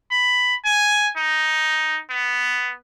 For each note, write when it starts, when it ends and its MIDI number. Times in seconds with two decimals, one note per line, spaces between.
0.11 0.55 83
0.65 1.08 80
1.17 1.99 63
2.10 2.72 59